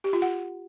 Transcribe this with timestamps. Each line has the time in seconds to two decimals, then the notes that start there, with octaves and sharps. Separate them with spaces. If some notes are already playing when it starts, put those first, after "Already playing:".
0.04 G4
0.13 F4
0.22 F#5